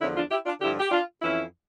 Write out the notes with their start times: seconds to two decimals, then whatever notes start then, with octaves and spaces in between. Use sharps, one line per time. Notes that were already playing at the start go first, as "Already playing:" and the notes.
0.01 E2 D3 F3 C#4 E4
0.16 D4 F4
0.31 E4 G4
0.46 D4 F4
0.61 G2 D3 F3 E4 G4
0.80 G4
0.91 D4 F4
1.22 F2 E3 C#4 E4